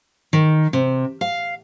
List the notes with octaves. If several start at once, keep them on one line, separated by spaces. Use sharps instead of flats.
D#3
C3
F5